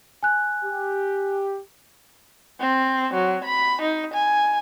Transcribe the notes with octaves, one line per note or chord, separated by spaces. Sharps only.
G#5 F#6
G4
C4
F#3
B5
D#4
G#5